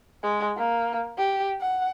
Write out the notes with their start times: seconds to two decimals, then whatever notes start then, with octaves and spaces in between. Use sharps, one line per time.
0.23 G#3
0.57 A#3
1.18 G4
1.61 F#5